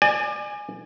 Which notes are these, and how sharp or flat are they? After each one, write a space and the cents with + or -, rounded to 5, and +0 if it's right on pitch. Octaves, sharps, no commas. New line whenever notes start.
D5 +35 G#5 +0